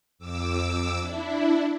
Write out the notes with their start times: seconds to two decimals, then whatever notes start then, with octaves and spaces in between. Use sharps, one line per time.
0.19 F2 D6 E6
1.00 D4 E4